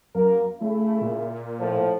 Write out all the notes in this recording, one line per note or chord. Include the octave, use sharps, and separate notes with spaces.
F#2 A#3 A#4
C#3 A3 E4
A#2
A2 F3